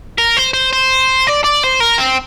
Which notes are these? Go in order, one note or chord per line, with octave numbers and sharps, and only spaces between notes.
A#4
C5
C5
C5
D5
D5
C5
A#4
C4